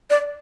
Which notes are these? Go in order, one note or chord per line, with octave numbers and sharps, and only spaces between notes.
D5